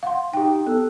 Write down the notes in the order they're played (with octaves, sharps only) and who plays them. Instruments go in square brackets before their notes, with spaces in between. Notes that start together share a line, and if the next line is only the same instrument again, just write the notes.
[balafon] F5 F#5 C6
[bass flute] D#4 [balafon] G4 G5
[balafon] B3 [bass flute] A4